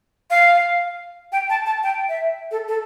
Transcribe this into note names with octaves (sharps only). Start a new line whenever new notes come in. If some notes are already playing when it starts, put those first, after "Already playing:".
F5
G5
A5
A5
G5
E5
A4
A4